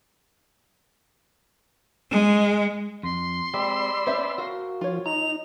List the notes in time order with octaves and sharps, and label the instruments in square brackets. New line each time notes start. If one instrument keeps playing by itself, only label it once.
[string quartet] G#3
[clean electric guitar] F2 [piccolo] C6
[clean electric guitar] G#3 C4 G4 [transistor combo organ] D5 B5 E6
[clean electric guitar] B3 C#4 [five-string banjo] C5 E5
[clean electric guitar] F#4 A#4 F5
[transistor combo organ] F3 [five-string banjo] F4 C#5
[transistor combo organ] D#4 [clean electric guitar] A#5 [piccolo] F7